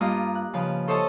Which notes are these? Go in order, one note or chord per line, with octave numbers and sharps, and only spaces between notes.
G2 A#3 F4 D#5
F#6
C#3 F3 B4
A4 C5 C#5 D#5 E5 A5